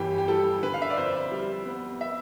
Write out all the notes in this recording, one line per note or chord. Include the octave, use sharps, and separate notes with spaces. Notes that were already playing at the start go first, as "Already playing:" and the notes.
Already playing: G1 F2 E3 G4
G4
G3 A4
D3 B4
F5
E5
D5
F2 C5
G3
B3
E5